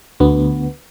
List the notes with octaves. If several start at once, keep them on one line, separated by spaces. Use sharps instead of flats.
D2 B3